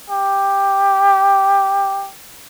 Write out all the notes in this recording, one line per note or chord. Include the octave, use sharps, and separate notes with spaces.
G4